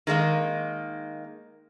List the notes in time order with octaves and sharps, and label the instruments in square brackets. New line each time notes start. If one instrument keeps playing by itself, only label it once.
[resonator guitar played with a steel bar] D#3 G#3 A#3 D#4